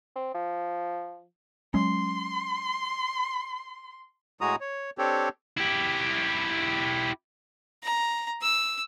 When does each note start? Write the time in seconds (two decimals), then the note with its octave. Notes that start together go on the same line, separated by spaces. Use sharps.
0.16 C4
0.34 F3
1.74 F#3 G#3 C#4 C6
4.41 A2 G#3 F#4 G#4 A#5 D#6
4.60 C#5
4.98 C4 D4 G4 A4 C#5
5.57 E4 G4
7.83 A#5
8.42 E6